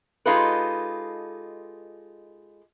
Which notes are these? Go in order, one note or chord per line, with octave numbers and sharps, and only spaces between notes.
G#3 D#4 F4 G4 A4 B4